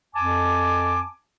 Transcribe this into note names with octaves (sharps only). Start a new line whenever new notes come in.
F2 G#5 A5 D6